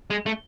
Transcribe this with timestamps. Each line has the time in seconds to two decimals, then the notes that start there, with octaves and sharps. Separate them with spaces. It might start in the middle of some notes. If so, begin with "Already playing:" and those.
0.10 G#3
0.26 A3